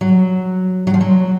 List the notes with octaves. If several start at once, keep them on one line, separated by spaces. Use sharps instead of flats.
F#3
F#3
F3
F#3